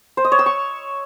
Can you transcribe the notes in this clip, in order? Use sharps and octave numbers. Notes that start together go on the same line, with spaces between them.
C5
D#5
C#5
E6
C#6